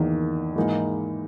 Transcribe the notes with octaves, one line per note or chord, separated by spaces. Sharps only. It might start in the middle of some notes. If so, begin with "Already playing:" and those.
Already playing: E2 D#3 A#3 D#4
G#2 E3 A#3 D#4